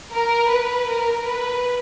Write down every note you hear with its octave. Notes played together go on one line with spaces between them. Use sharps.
A#4
B4
A#4
B4